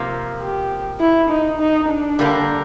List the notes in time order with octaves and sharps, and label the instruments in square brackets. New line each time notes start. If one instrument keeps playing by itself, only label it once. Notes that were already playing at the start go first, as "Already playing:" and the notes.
Already playing: [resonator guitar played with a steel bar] C3 F3 A#3
[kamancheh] G4
E4
D#4
D#4
D4
[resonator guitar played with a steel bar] D3 G3 A#3